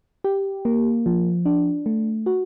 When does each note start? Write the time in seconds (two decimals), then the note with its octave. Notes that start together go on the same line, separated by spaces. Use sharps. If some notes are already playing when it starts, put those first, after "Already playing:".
0.24 G4
0.65 A#3
1.06 F3
1.46 D4
1.86 A3
2.26 F#4